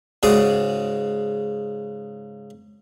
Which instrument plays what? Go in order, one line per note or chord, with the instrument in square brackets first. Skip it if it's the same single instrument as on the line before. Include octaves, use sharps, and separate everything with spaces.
[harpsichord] G#2 C#3 F#4 G#4 D5 D#6